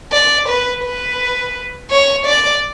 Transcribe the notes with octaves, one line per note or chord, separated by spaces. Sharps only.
D5
B4
B4
C#5
D5